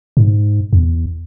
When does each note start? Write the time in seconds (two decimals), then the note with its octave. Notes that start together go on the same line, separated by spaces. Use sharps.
0.17 G#2
0.73 E2